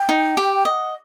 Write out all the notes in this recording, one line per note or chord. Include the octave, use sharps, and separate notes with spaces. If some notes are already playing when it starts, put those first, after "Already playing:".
Already playing: G5
D#4
G4
D#5 F#5 G5